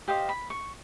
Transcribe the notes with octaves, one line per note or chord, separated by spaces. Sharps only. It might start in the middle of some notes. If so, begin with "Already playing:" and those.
G4 C5 D#5 F5
B5
C#6